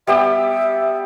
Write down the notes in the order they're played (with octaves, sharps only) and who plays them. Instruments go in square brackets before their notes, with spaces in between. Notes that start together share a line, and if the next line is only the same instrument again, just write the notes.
[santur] G3 B3 G4 [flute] E5